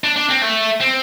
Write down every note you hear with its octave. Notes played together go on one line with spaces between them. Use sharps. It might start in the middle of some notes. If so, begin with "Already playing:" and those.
D4
D4
C4
A3
C4